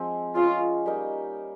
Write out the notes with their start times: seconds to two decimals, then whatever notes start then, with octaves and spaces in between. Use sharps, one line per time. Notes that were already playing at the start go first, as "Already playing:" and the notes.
Already playing: F3 G#3 C4 C5
0.35 C#4 F4 G#4 D#5
0.86 G3 A#3 D#4